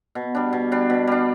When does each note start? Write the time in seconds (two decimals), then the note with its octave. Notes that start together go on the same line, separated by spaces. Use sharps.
0.15 B2
0.35 G3 D4
0.53 B2
0.72 G3 D4
0.90 B2
1.07 G3 D4